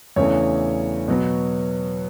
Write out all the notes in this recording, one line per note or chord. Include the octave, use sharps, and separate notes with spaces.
E2 C#3 E3 A3 D4 C#5
B2 F#3 B3